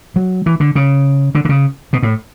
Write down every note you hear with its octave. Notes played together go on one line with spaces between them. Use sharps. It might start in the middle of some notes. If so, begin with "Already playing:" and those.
F#3
E3
D3
C#3
D3
D3
C#3
B2
A2